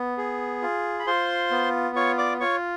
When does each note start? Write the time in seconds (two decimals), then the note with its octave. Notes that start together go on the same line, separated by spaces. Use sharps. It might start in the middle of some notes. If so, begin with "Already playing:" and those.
Already playing: B3
0.18 G#4
0.62 F4
0.99 B5
1.07 F4 C5 C6
1.51 B3
1.96 F4 C#5 C#6
2.18 D5 D6
2.40 F4 C#5 C#6